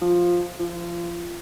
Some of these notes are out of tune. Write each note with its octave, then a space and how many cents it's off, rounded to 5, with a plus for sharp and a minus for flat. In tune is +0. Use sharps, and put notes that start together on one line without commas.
F3 +5
F3 -25